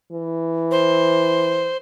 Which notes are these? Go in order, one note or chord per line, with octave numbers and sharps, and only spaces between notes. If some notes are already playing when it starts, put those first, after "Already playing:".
E3
C5